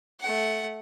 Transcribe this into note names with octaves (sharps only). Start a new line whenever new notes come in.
A3 F#5